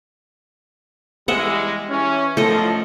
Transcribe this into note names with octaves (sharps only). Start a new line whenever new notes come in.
E2 G3 G#3 D#5 E5 F#5
E3 C#4
F#2 F3 A3 D#5